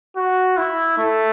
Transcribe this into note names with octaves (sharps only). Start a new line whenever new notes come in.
F#4
E4
A3